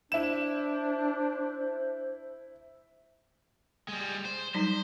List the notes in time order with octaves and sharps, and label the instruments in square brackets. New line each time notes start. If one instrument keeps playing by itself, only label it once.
[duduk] D4 [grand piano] E4 E7 [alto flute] C5
[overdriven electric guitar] G3 G#3
C5
[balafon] F#3 G3 D#4 [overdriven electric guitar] C5